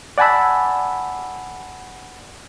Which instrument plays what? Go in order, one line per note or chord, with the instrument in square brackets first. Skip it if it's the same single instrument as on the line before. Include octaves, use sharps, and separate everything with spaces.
[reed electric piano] D5 F#5 G#5 A5 B5 E6